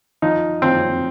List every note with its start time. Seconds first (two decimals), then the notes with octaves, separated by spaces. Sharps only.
0.22 F3 D#4
0.62 F3 C4